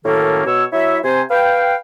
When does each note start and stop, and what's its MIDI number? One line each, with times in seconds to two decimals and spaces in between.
0.05 0.44 42
0.05 0.44 45
0.05 0.44 51
0.05 0.44 58
0.05 0.44 61
0.05 0.44 69
0.46 0.64 47
0.46 0.64 73
0.46 0.64 88
0.73 0.99 54
0.73 0.99 64
0.73 0.99 73
0.73 0.99 76
1.04 1.22 48
1.04 1.22 72
1.04 1.22 80
1.31 1.76 71
1.31 1.76 77
1.31 1.76 79